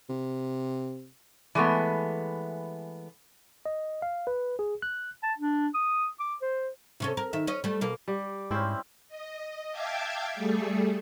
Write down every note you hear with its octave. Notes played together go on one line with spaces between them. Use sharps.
C3
E3 G#3 A3 B3
D#5
F5
B4
G#4
F#6
A5
D4
D#6
D6
C5
C3 C#4 A4
A#4
D#3 E5
C#4 D#5
G3 A3
B2 A#3
G3 D6
G#2 C4 C#4 E4 C5
D#5
E5 F5 G5 A5 D6 G#6
G3 A3 G#4 A4